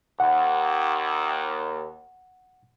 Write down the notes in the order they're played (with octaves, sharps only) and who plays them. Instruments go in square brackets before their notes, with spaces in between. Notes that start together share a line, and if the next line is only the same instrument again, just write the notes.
[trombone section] D#2 [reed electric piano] F#5